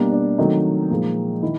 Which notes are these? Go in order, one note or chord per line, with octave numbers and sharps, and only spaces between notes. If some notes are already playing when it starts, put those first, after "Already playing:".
Already playing: B2 G3 A#3 D4
D4
C3 D#3 F#3 A3 D#4
A#2 F3 G#3
D#3 E4